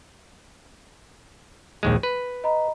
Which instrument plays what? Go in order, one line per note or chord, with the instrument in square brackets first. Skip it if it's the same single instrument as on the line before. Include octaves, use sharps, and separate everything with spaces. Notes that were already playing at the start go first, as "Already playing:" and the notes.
[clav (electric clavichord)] A#1 D#2 G#3
B4
[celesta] D#5 A#5 B5